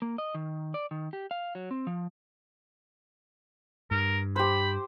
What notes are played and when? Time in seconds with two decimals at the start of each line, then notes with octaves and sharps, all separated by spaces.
0.02 A#3
0.18 D#5
0.35 D#3
0.74 D5
0.91 D#3
1.13 G4
1.31 F5
1.55 F#3
1.71 C4
1.87 F3
3.91 G2 A#4
4.36 G4 C5 B5